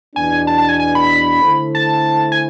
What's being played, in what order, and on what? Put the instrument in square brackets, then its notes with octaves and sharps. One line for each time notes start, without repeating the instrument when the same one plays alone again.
[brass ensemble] E2 B2 B3 D4 [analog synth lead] G#5
[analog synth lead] A5
A5
G#5
G#5
B5
[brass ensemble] D3 A3 E4 A4 C5
[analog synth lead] A5
G#5